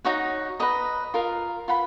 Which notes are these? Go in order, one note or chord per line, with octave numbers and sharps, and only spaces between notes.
D#4 F#4 C#5 F#5
B4 D#5 A#5
F4 A#4 F5
F4 B4 F#5 B5